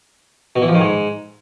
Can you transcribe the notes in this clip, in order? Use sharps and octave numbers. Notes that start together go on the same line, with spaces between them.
B2
E3
F3
D#3
G#2